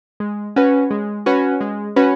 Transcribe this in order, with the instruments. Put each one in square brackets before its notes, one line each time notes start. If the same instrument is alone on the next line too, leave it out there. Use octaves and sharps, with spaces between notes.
[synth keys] G#3
C#4 F#4 B4
G#3
C#4 F#4 B4
G#3
C#4 F#4 B4